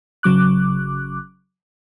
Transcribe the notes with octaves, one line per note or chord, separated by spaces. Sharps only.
G#1 C#3 F#3 D6 F#6